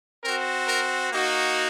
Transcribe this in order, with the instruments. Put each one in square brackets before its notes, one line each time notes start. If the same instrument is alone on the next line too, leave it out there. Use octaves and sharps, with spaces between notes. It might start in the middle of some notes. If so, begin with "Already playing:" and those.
[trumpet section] C4 F#4 A#4
A#4
A#3 D#4 F#4